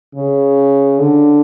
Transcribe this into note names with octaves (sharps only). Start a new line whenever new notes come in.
C#3
D3